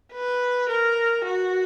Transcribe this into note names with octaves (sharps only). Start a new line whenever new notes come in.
B4
A#4
F#4